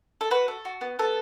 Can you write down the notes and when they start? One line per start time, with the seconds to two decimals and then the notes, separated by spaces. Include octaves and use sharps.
0.21 A4
0.31 F#4 B4
0.48 A4
0.65 F#4
0.81 B3
0.99 B3 A4